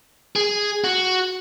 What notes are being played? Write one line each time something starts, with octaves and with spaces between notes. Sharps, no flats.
G#4
F#4